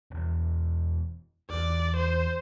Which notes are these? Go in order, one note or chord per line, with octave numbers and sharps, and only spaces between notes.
E1 E2
E2 D5
C5